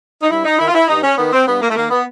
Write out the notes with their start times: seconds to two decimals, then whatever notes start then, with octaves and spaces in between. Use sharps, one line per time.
0.22 D#4
0.30 G2 E4
0.45 D#4
0.59 D#3 E4
0.68 F4
0.74 E4
0.88 G2 D#4
1.03 C#4
1.18 D#3 B3
1.33 C4
1.47 G2 B3
1.61 A#3
1.69 A3
1.76 D#3 A#3
1.90 B3